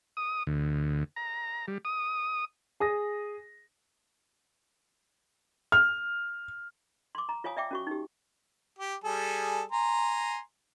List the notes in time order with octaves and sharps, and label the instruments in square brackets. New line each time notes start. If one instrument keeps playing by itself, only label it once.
[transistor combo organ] D#6
D2
A#5
G3
D#6
[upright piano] G#4 D#6 A#6
[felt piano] F6
[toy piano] C6 D6
A#5
F4 C#5 F5 G#5 D#6
D5 E5 G5 D6
C#4 F#4 C#6
D#4 G4
[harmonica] G4
G3 G#4 A4
G#5 A#5 C6